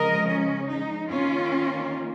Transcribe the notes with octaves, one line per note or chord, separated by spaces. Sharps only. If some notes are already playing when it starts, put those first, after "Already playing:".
Already playing: C#3 F3 G#3 A#4 D#5
C#4
D#4
D#3 A#3 C#4 F4